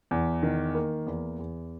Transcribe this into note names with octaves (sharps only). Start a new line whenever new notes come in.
E2
D#3
A#3
E2
E2